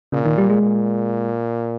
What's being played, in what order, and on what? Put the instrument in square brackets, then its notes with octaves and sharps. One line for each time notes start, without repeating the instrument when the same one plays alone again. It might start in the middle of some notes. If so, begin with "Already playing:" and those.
[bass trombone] A#2 [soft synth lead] C#3
[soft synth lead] D#3
G3
G#3
[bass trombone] A#2